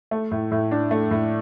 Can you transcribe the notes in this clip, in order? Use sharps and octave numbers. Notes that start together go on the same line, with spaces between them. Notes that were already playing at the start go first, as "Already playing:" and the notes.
A3
A2
A2
D4
A3
A2